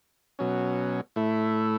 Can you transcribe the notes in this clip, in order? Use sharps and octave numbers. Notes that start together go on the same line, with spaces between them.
B2 F#3 C#4
A2 A3 E4